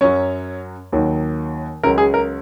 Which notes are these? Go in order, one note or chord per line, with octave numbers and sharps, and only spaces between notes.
F#2 F#3 C#4 C#5
D#2 D#3 F#3
C#2 C#3 F#3 A#4
G#4
A#4